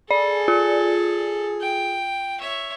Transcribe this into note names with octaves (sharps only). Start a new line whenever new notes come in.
G#4 A4 D5
F4
G5
C#5 E5